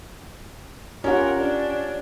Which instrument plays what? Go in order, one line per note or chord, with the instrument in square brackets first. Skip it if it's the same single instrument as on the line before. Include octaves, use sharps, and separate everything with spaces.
[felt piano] C#4 [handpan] F4 G4 F#5 [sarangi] A#4
[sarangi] D4